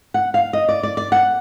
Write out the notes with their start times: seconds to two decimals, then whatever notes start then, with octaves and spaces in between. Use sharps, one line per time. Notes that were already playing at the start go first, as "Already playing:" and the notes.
0.14 F#5
0.34 F5
0.53 D#5
0.69 D5
0.83 D5
0.97 D5
1.12 F#5